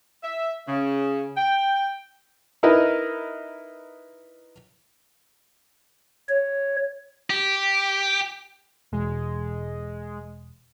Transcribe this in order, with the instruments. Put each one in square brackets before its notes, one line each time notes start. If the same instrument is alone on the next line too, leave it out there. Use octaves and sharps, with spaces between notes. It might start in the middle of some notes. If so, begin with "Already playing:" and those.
[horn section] E5
C#3
G5
[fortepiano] D#4 E4 A#4 B4 D#5
[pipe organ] C#5
[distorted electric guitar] G4
[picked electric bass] E1 [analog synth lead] G#3